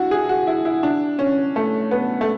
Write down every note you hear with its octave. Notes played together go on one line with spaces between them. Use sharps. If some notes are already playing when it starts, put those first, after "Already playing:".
Already playing: D4 E4 F#4
G#4
F#4
E4
E4
D4
C#4
A3
B3
A3